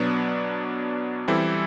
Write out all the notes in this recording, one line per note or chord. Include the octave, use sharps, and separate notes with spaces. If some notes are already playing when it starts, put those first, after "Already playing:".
Already playing: B2 F#3 B3 D4
E3 G3 C4 E4 A4